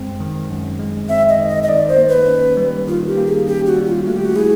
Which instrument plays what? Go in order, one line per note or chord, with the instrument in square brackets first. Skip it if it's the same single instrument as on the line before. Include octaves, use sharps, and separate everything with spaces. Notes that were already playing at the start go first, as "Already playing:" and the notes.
Already playing: [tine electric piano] F#2 G#3 C4
D#3
F#2
G#3
[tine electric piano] C4 [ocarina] E5
[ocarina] D#5
[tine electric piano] D#3
[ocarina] D#5
D#5
[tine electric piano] D#3 [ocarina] D5
[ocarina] C5
[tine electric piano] A#3
[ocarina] B4
[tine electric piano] C#4
G3
[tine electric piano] D#3 [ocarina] F4
[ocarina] G4
[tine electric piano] A#3
[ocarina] G#4
[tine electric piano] C#4 [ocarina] G4
[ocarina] F#4
[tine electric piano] G3
[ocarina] F4
[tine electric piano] A3 [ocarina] F#4
[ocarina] G4
F#4
[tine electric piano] E4 [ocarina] G#4